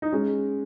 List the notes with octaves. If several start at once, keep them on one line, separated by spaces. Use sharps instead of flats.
D#4
G#3 C#4